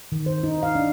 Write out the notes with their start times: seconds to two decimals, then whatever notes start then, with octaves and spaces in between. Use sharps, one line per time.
0.12 D#3
0.26 C5
0.43 D#4
0.63 F5
0.75 D4